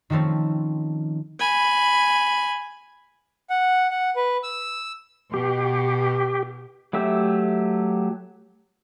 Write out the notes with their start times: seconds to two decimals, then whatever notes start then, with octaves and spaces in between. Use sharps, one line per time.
0.10 D#3 F3 A3 C4 C#4
1.39 G#5 B5
3.50 F#5
3.91 F#5
4.16 B4
4.43 E6
5.34 B2 G4
6.93 F#3 A3 G4 E5